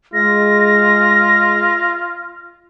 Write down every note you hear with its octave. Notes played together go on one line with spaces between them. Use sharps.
G#3 F4 A#6